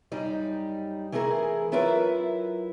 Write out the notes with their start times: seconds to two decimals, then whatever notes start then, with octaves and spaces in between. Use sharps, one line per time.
0.12 F#2 G3 D#4
1.12 E3 A3 E4 G#4 A#4
1.72 F#3 E4 F4 A#4 B4 E5